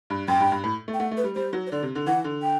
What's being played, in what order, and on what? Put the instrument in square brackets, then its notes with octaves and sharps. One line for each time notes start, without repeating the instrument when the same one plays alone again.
[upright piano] G2
[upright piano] F#2 [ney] G5
[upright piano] G2
G2
A2
A3
[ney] G5
[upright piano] A3 [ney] F#5
[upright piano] A3
[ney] B4
[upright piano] G3
[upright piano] G3 [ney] C5
[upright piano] F#3
[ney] C5
[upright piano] D3 [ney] D5
[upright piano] C3
D3
[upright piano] E3 [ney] F#5
[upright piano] D3
[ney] G5